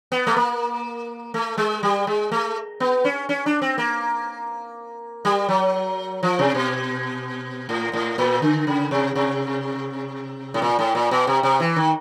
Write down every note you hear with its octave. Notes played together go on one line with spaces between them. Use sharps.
B3
A3
A#3
A3
G#3
G3
G#3
A3
B3
C#4
C#4
D4
C4
A#3
G3
F#3
F3
C3
B2
A2
A2
A#2
D3
C#3
C3
C3
A2
A#2
A2
A#2
B2
C3
C3
E3
D#3